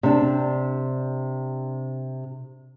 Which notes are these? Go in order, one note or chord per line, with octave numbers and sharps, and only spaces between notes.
C3 D4